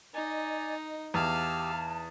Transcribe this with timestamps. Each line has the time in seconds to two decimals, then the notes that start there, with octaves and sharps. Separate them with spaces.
0.14 D#4 D5 D#5 G#5
1.14 E2 G4 F5 A5 E6